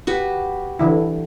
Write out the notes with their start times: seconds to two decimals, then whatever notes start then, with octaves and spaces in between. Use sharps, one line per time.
0.07 F#4 G4 B4
0.79 D3 E3 E4